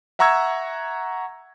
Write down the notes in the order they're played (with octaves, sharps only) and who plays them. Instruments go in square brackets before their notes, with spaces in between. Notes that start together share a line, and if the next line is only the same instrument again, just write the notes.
[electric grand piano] E5 F#5 A#5 C#6 E6 G#6